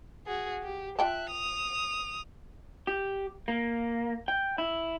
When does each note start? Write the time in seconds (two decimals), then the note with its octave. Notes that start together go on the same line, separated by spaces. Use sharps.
0.26 F#4 G#4
0.63 G4
0.99 F4 E5 G5 A5 F#6
1.31 D#6 F7
2.87 G4
3.48 A#3
4.28 G5
4.58 E4